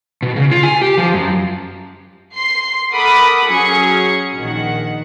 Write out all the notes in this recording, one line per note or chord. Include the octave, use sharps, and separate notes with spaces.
B2
C#3
F4
G#5
G4
F3
F#2
C6 C7
A4 A#4 F#5 B5 D6 D#6
F#3 C#4 G#4 G#6 C#7
A#1 D#3 F#5